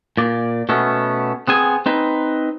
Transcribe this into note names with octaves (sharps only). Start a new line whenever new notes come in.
A#2 D5
B2 A3 B3 C#4
B3 C4 G#4 G#5
C4 D#4 B4